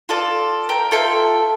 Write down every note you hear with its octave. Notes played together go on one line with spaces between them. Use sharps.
F4 A4 D5
A#4 G5
F4 A4 E5 G5